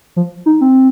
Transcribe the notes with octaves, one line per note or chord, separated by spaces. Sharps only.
F3
D#4
C4